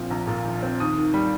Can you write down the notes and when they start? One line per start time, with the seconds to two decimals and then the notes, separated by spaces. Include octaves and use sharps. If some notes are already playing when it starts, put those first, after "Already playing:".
Already playing: A#1 A#2 F3 C4
0.10 A#1 A#5
0.27 A#2
0.45 F3
0.62 C4
0.80 D#2 D#6
0.98 D#3
1.14 G3